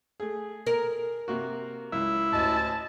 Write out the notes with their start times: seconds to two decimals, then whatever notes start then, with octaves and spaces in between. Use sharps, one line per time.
0.20 A3 G#4
0.67 A#4
1.28 C3 A#3 F#4
1.92 C#2 E4
2.32 A1 D2 C#4 D#5 A5